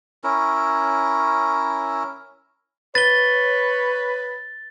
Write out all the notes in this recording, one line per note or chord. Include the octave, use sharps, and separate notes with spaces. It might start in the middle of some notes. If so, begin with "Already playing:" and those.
C#4 E4 A#4
B4 C#5 A6 G7